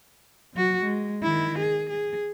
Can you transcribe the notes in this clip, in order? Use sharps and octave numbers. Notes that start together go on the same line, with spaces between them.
F#3 F#4
G#3
D#3 E4
G#4
G#4